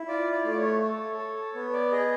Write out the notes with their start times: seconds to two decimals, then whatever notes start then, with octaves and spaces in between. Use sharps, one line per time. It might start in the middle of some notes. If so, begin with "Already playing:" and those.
Already playing: E4
0.08 F4 D5
0.32 D5
0.45 A3
0.51 D5
0.57 C#5
0.82 A4
1.18 A4
1.54 B3 C#5
1.73 D5
1.91 G#4 D#5